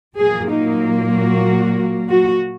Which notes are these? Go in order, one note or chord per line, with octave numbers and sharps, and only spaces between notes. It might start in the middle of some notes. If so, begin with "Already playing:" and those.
A#2 F#3 A#3 G#4
D#4
F#4
F#4